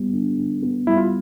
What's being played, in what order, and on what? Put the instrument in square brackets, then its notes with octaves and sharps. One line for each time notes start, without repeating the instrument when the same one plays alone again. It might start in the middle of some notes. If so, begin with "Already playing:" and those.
Already playing: [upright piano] G3 B3
D3
D3
B3
[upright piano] G3 [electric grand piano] E4
[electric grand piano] F4